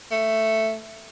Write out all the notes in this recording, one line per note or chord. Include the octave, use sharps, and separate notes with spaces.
A3